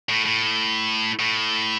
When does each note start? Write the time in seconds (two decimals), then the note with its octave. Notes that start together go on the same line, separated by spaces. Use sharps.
0.10 A2
0.26 A2
1.19 A2